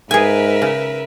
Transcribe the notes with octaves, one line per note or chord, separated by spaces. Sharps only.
G#2 G#4 A#4 B4 E5 G#5
C#3